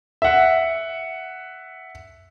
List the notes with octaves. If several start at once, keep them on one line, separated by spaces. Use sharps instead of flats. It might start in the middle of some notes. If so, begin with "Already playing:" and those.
E5 F#5